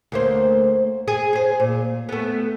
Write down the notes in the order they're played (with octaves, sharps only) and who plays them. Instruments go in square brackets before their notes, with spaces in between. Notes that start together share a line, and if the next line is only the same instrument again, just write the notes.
[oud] D2 A#3 C5
G#4
G#4 C5
A#2
A3 B3